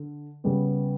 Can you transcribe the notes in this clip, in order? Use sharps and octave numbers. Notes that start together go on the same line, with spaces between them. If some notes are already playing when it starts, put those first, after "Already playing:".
Already playing: D3
C#3 G3 B3